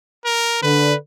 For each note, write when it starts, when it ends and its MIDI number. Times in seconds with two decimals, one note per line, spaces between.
0.25 0.62 70
0.62 0.94 50
0.62 0.95 71